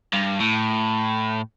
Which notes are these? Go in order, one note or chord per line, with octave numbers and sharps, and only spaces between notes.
G2
A2